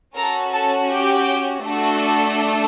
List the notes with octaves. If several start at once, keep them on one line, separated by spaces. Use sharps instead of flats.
C#4 F#4 A4 A#4 A#5
A4 A5
G4 G5
A3 D4 F#4 A4